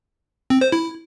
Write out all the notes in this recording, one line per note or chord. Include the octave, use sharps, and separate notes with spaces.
C4
C5
E4